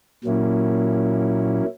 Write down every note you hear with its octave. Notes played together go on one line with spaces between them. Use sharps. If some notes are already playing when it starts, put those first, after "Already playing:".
A#2 F#3 A#3 C#4 E4